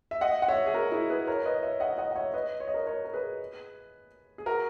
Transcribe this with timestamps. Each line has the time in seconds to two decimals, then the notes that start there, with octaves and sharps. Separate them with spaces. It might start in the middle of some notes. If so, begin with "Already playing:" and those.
0.11 E5
0.21 D#5 F#5
0.42 F#5
0.48 C#5 E5
0.66 G#4
0.74 F#4 A#4
0.92 E4 G#4
1.10 G#4 B4
1.27 A#4 C#5
1.45 B4 D#5
1.63 C#5 E5
1.80 D#5 F#5
1.98 D#5 F#5
2.11 F#5
2.15 C#5 E5
2.34 B4 D#5
2.60 C#5
2.68 D#5
2.74 A#4 C#5
2.87 A#4 C#5
3.04 A#4
3.13 G#4 B4
4.38 G#4
4.46 F#4 A#4